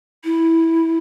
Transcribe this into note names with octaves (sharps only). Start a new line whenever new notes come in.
E4